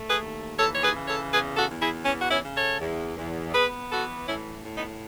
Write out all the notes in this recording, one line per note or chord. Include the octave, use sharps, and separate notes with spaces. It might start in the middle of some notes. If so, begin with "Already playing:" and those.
Already playing: A3
G#4 B4
D#2
E3 A4 C#5
C#5
G#4 B4
C#3
A4 C#5
E2 G#4 B4
F#4 A4
E2
E4 G#4
E3 C#4
F#4
C#4 E4
C#3
A4 C#5
E2
E2
B3 G#4 B4
E3 F#4 A4
A2 C#4 E4
A2
B3 D#4